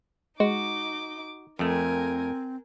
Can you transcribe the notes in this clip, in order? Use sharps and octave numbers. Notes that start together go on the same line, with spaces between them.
G#3 D#4 F#4 D6
F2 A3 C4 A#4 G#5